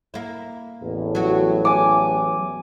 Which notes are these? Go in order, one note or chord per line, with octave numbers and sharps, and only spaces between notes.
A#3 E4
A1 E2 A2
F#3 F#4
G#5 D6